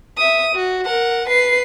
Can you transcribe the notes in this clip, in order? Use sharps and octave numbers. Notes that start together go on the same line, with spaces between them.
E5 D#6
F#4
A#4 F#5
B4 C7